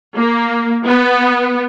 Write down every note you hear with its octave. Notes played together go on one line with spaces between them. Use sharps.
A#3
B3